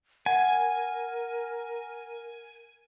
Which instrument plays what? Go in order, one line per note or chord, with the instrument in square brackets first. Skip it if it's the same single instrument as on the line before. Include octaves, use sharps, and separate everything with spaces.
[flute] A#4 [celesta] F#5 [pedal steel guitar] G#5